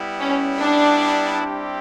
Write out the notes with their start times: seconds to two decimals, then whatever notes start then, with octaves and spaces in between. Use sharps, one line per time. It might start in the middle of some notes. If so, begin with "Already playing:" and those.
Already playing: G3 B3 E4
0.19 C#4
0.60 D4
1.42 G3 C4 E4 G4